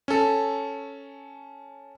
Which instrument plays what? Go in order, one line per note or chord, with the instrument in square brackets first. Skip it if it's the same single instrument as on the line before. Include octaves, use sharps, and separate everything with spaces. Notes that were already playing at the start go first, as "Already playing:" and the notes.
[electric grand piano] C#4 A4